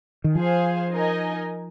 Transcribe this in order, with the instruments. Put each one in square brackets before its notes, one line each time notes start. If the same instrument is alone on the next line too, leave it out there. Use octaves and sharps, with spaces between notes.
[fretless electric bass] D#3
[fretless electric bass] F3 [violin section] G#4 C5 F5 G#5
[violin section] D#4 A#4 D#5 G#5